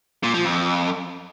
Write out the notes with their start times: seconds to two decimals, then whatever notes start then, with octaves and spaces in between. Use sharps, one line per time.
0.23 A#2
0.34 F3
0.45 F2